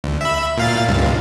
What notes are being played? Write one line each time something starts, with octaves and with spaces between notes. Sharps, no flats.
D2
E5 B5
A#2 F5 A6
C#2 G2